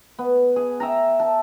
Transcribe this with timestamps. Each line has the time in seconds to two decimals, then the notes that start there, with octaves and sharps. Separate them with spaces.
0.19 B3
0.56 G#4
0.80 E5 G5 A#5
1.20 A5